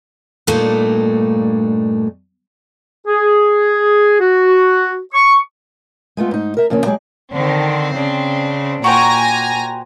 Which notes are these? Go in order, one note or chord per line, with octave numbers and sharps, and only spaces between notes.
G2 A#2 A3 A#3 D4 D#4
G#4
F#4
C#6
G#3 A3 B3 F4
G#2 D#4
A#4 E5
F2 C#3 A#3 C#4
F#3 G#3 G4 G#4
D3 D#3 C4
C#3 D4
A#2 F#4 G4 C5 G#5 A#5 A#6